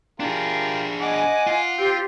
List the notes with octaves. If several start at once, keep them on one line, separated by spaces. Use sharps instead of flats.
D4 F4 G4 G#4 A#4
D#5 F#5 G#5 D6
F4
C4 G4 C5 G5